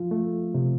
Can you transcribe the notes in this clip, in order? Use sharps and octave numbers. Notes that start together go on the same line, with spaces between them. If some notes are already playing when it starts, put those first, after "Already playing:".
Already playing: F3 F4
A3
C3